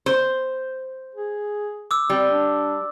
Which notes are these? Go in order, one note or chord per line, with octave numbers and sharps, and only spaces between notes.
C5
G#4
D6 E6
G3 C4
D4